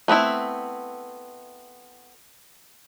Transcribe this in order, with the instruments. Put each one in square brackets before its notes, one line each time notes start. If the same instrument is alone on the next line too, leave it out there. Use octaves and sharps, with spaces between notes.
[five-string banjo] A3 B3 C4 E4